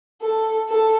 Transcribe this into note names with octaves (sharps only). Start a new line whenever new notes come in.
A4
A4